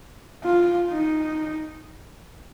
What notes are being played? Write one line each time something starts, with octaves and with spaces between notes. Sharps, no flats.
F4
D#4